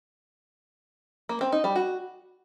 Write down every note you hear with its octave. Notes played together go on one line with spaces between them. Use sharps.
A#3
C4
D#4
G3
F#4